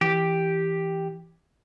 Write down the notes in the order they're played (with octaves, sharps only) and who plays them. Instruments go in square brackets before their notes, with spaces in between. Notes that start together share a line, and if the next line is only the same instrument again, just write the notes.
[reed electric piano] E3 [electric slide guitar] G4